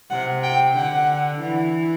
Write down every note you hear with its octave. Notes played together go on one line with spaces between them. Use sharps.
C3 F#5
G5
D3 F#5
E3